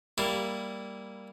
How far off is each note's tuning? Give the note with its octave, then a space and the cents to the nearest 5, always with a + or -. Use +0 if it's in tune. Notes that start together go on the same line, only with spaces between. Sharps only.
G3 +0 A#3 -5 E4 +0